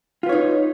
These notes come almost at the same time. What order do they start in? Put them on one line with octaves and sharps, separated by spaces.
F4 B4 C#5 D#4